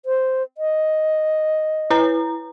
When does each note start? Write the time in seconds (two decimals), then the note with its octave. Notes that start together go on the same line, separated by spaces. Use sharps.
0.06 C5
0.58 D#5
1.90 E4 B4 A#5